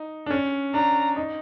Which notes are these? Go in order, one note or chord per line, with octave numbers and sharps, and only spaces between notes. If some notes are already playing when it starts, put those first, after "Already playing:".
Already playing: D#4
D4
C#4
D4 A#5
D#4